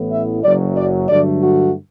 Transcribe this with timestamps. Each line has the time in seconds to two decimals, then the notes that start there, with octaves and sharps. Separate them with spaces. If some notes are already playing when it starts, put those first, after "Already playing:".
Already playing: A1 A2 E3 B3
0.12 E5
0.43 F#1 F#2 F#3 D5
0.76 D5
1.09 G2 D3 F#3 A3 D5
1.42 F#4